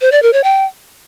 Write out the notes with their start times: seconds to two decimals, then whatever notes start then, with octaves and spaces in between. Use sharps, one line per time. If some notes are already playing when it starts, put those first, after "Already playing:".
0.01 C5
0.12 D5
0.22 A#4
0.33 C#5
0.44 G5